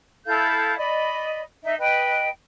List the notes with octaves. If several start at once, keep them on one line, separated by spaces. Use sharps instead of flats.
E4 A4 F5 G6
D5 D#5 B5
D#4 E5
B4 D#5 G5